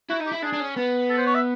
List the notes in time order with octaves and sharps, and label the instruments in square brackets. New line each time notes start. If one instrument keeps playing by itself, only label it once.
[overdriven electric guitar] E4 [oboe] F#4
[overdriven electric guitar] D#4
[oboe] G4
[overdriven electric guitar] E4
[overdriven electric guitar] D4 [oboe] G#4
[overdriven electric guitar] D4
C#4
B3
[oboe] A4
C5
C#5
E5